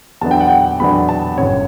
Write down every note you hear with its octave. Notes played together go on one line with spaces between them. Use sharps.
E2 D3 F#3 B3 D4 A5
G5
F#5
G5
E2 D3 F#3 B3 D4 B5
A5
G1 F#2 C#3 C#5